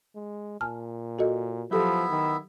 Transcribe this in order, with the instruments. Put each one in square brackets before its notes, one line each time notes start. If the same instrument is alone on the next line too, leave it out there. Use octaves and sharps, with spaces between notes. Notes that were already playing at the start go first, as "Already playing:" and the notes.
[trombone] G#3
[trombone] A#2 [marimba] G#5 A5 F6
[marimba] F#4 A4 D#5
[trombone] F3 [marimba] F#3 G4 A4 [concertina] B3 E4 E5
[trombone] D#3